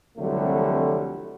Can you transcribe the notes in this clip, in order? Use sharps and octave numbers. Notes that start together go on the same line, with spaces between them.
C2 F2 D3 F#3 G3 A3